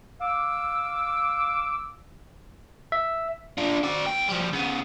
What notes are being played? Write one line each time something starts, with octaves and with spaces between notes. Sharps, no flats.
F5 D6 E6
E5
D4 F4
F#4 D5
C#2 G5
F3 G3
C#3 B3